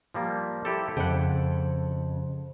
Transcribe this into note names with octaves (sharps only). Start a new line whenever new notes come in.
F3 G3 A#3
E4 G4 A4
F2 C#3 F#5 G5